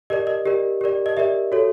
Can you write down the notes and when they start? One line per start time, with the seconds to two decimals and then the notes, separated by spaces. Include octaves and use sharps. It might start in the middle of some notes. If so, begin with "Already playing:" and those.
0.10 G4 A#4 D5 D#5
0.27 D#5
0.46 G4 A#4 D5
0.81 G4 A#4 D5
1.06 D#5
1.17 G4 A#4 D5 E5
1.52 F#4 A4 C#5